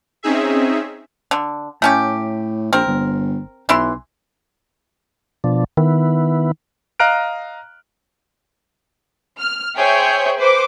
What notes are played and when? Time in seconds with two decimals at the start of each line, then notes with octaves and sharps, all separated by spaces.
0.23 C4 C#4 D#4 G#4 E5
1.31 D3
1.82 A2 A3 C#4 G4
2.73 A#1 C4 A#4
2.87 G1
3.69 B1 E3 E4 C6
5.44 B2 F3 D4
5.77 D#3 B3 E4
7.00 D#5 F5 A#5 F6 F#6 D7
9.39 F6
9.77 G#4 C5 C#5 E5 G5 G6
10.36 B4 C5 D6